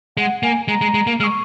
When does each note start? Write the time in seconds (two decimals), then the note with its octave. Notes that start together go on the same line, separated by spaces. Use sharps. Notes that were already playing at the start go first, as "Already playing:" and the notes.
0.17 G#3 F#5
0.43 A#3 G#5
0.68 G#3 A#5
0.81 G#3
0.94 G#3
1.07 A#3
1.20 G#3 F6
1.23 C#6